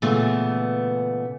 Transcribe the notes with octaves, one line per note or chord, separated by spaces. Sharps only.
A#2 C#3 E3 A3 B3